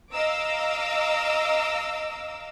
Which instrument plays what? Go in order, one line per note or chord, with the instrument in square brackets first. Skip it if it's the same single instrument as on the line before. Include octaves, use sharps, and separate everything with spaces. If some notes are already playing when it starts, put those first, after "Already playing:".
[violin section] D#5 F5 A#5 D6 E6